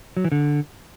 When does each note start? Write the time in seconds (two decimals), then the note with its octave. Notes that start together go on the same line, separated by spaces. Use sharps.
0.17 F#3
0.24 E3
0.32 D3